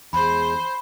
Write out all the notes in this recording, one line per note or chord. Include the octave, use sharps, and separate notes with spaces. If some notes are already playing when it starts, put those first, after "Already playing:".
E2 G#3 C5 B5